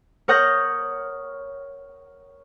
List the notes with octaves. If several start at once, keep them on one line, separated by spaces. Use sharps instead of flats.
A#4 C#5 F#5 D#6 G6 A#6